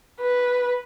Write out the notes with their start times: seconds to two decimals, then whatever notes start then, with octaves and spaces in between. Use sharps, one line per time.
0.21 B4